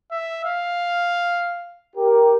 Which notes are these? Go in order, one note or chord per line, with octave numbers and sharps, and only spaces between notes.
E5
F5
G4 A#4